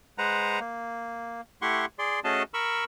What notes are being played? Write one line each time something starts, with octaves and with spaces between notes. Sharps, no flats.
G#3 B4 C5 F#5 A#5
A#3
A3 E4 G4 F#5 C6 C#6
G#4 D5 C6
A3 C#4 F#4 G#4 D#5 A5
A#4 B5 C#6 E6